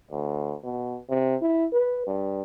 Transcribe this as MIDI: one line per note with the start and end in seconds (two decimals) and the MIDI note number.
0.11 0.55 38
0.63 0.97 47
1.09 1.36 48
1.41 1.66 64
1.72 2.03 71
2.07 2.42 43